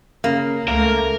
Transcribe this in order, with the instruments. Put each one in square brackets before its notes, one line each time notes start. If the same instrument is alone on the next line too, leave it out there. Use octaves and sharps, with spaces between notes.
[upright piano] C#3 [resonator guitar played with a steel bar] A#3
[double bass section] C#2 A3 [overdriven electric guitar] A#4 [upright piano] F5